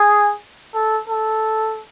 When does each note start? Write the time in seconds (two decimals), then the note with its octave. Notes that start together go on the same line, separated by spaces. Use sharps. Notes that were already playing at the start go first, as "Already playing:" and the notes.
Already playing: G#4
0.74 A4
1.08 A4